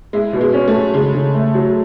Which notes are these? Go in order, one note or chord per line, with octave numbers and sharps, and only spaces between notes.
G#3 E4
B2
G#3
C#4
A3
F#3
C#3 G#3
C#3
A3
F#3